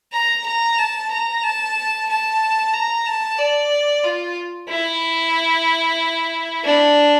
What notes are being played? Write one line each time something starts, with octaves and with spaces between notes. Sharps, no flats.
A#5
A#5
A5
A#5
A5
A5
A#5
A5
D5
F4
E4
D4